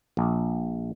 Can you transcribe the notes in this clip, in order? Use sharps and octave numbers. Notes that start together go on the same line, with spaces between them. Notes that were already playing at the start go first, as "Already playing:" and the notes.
A#1